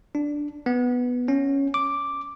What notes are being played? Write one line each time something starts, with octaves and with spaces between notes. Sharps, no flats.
D4
B3
C#4
D6